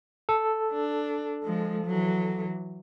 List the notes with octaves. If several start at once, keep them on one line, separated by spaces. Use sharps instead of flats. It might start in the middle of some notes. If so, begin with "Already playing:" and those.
A4
D4
F3 G#3
E3 F#3